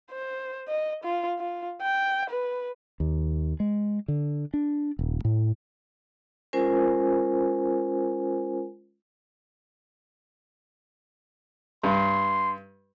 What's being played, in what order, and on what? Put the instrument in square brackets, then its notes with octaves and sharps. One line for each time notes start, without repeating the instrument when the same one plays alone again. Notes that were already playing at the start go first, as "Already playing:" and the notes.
[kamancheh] C5
D#5
F4
F4
G5
B4
[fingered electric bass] D#2
G#3
D3
D4
D#1
A2
[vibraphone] G#3 C#4 F4 A#4 C5 G#5
[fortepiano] G2 [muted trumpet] C6